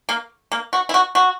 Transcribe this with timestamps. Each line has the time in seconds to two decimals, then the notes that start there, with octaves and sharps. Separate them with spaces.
0.09 A#3
0.52 A#3
0.73 F#4
0.89 E4
0.94 F#4
1.15 F#4